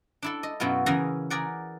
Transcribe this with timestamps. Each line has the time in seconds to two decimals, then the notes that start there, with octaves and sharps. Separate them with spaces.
0.22 D4 E4 A4
0.43 D#5
0.60 F#2 B2 B3 E4 F4
0.86 C#3 E3 G#4 A#4 A#5
1.30 G#4 A#4 D5 F#5